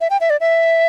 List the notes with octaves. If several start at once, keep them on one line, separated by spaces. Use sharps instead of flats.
E5
G5
E5
D5
E5